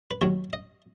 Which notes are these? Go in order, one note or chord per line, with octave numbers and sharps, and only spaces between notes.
B4
D#2 D#3 F#3 C#5
D#5